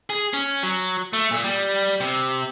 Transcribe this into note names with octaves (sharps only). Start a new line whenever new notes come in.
G#4
C#4
F#3
A3
A#2
G3
C3